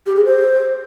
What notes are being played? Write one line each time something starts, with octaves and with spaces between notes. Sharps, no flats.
G4
G#4
C5